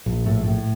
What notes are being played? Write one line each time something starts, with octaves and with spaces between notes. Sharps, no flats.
A#1
A2
A2